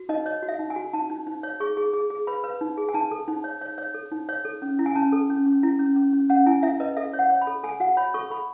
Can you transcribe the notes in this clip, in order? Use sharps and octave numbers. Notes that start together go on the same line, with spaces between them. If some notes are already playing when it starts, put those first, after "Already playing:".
Already playing: F#4
D#4 D#5
C#5 D#5
F#4
E5
D#4
G#5
F#4
D#4 A5
D#4
D#4
C#5
G#4 C#6
G#4
G#4
G#4
B4 B5
B4
D#4
G#4
G#5
D#4 A5
A4
D#4
C#5
C#5
C#5
A4
D#4
C#5
A4
C#4
E4
G#5
C#4 A5
A4
C#4
C#4
E4
C#4
C#4
C#4
C#4 F#5
E4 G#5
E4 E5
B4 D#5
A4 E5
C#5
F#5
C#5
B5
A4
A4 G#5
F#4 F#5
C#5 B5
A4 C#6
A4 B5